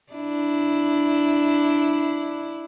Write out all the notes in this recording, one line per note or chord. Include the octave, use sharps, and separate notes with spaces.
D4 E4